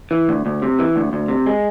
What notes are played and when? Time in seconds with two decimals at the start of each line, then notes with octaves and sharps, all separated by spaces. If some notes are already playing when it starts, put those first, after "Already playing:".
0.11 E3
0.29 D2
0.46 D2
0.62 C3
0.79 E3
0.96 D2
1.13 D2
1.28 C3
1.46 G#3